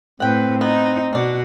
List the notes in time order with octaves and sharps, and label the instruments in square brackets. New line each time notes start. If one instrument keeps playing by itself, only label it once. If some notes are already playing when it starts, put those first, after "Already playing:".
[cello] A2 B4 [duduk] C4 [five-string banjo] F#5 G5
[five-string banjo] B3 [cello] D#4
[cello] B2 F#4 [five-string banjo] D4 D5